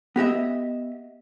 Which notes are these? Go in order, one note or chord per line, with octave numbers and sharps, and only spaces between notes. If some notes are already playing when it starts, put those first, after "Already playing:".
B3 G4 D#5 E5